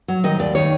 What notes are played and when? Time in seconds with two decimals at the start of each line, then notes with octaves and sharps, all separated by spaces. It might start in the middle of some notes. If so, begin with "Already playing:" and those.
0.08 F#3
0.24 D#3 D#5
0.39 D#2 D5
0.55 D#3 C#5